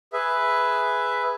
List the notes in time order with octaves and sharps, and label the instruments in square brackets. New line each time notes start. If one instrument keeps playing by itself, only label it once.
[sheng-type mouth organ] G#4 B4 E5